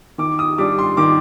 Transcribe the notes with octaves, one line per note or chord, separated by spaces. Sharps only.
D#3 D6
D#6
G3 D4 D6
C6
D#3 D6